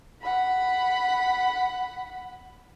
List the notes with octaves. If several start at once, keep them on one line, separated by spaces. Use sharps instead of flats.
F#5 B5